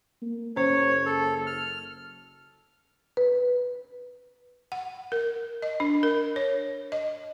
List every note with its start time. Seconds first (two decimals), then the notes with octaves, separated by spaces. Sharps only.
0.22 A#3
0.56 F#1 C#4 C5 C#5
1.06 A4
1.47 F6
3.17 B4
4.72 F#5
5.12 A#4
5.62 D#5
5.80 D4
6.03 A#4
6.36 C#5
6.92 D#5